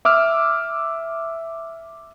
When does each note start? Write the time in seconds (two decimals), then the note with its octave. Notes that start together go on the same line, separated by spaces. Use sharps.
0.05 E5 D6 E6 F6